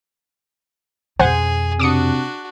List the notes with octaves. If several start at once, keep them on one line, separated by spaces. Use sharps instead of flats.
F2 B2 G#4 C5 F#5 G#5
C3 D4 F#4 D6 D#6 C#7